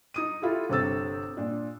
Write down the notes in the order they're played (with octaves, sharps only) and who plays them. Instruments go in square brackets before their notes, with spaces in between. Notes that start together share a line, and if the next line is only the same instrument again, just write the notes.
[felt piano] D#4 D#6 D#7
E4 F4 G4 A4
G1 C3 C4 A4 E6 A6
A#2 D4